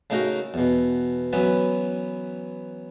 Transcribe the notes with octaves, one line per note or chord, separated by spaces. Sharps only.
C#3 A3 D#4 F#4 A#4
E2 B2
E3 F#3 B3 C#4 B4